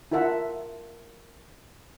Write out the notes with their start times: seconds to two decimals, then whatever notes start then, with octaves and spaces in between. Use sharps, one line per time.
0.11 E4 F4 A#4 E5 F#5 A5